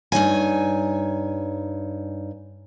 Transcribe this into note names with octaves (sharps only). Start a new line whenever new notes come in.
G2 D#4 C#5 G#5